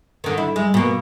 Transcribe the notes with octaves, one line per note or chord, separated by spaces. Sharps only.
D3 D#3
E4
G#3
B2 A#3